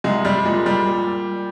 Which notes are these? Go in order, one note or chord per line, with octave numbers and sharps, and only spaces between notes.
C2 G#3
G3
A#2 G#3
G3
A#2